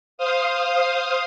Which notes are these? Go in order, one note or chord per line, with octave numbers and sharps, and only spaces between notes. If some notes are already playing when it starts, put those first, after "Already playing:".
C5 F5 D#6